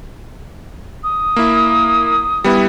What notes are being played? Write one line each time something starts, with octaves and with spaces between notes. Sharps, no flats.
D#6
A#3 E4
G3 B3 E4